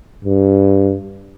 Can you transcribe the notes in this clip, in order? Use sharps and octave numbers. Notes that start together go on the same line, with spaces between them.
G2